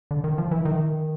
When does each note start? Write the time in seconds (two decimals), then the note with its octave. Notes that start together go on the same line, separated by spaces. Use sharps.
0.11 D3
0.24 D#3
0.38 F3
0.51 E3
0.65 D#3
0.72 E3
0.79 D#3